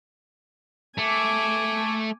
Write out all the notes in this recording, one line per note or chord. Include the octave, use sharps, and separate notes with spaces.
A3 G#5 D6